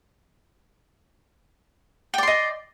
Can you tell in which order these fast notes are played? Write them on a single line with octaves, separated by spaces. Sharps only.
G5 D5 C6 D#5